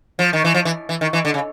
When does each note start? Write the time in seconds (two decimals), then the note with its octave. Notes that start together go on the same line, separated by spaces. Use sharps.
0.19 F3
0.33 D#3
0.44 E3
0.54 F3
0.65 E3
0.89 E3
1.01 D#3
1.13 E3
1.25 D3
1.34 C#3